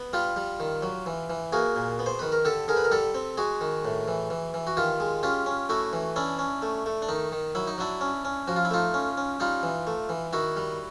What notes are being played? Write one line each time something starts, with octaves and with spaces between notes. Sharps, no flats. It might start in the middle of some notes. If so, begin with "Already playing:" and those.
Already playing: B3
G3 F4 G4
G3
D#3
F#3
E3
E3
A#3 F#4 G#4
A#2
B3
C5
D#3 B4
A#4
D3 G4 A4
D3 G#4 A#4
B4
A#4
G3 G4 A4
C4
G#3 F#4 G#4
D#3
A2
E3
E3
E3
F#4
D#3 F4 G4
G#3
C#4 F4 G4
C#4
A3 E4 F#4
E3
C#4 D4 E4
C#4
A3
A3
D4
D#3 D#4
D#3
F#3 E4
D#4
F#3 D4 E4
C#4
C#4
F3 F#4
F4
E4
A3 D#4 F4
C#4
C#4
G3 D#4 F4
E3
A3
E3
D#3 E4 F#4
G3